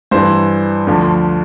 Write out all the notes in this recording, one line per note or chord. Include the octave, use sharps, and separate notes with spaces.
G2 E3 C5
D2 D3 F3